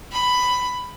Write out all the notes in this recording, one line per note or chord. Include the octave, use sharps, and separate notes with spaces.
B5